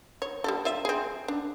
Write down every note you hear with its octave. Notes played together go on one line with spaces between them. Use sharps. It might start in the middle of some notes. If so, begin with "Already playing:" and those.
C#5
G3 G4 A4
F4 E5
C4 G#4
D4